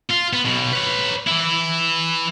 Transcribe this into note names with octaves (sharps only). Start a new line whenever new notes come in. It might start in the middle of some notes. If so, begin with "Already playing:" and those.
F4
B3
B1 B2
B4 C#5
E3 E4